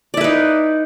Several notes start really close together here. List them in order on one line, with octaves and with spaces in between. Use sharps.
D5 E4 B4 D#4